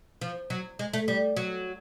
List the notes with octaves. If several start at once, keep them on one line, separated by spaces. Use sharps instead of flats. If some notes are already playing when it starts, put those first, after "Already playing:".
F3
F#3
G#3
A3
G3
F#3